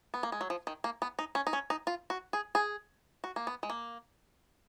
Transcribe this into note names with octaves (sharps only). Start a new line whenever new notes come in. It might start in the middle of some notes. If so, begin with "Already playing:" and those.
B3
A#3
G#3
F#3
F3
D#3
A#3
B3
D#4
C#4
D#4
C#4
D#4
F4
F#4
G#4
G#4
F#4
A#3
B3
G#3
A#3